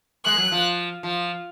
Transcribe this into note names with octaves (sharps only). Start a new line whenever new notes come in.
G#3 F#6
F#3
F3
F3